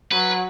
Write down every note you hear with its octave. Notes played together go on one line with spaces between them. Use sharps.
F#3 B4